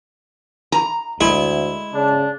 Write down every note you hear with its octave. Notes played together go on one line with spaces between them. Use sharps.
A#5
D2 G#3 E4
C#3 D4